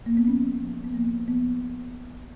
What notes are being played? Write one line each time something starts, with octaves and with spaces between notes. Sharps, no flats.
A#3
B3
F3 C#4
F3
B3
F3 A#3
F3 B3